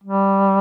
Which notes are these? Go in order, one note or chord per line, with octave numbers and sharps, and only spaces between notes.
G3